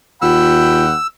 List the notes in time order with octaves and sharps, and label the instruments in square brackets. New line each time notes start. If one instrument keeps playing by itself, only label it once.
[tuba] D#2 [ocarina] F4 [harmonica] F#5 G5 B5 [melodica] E6